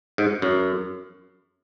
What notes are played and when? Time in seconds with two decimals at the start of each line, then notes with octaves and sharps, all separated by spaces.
0.18 G#2
0.42 F#2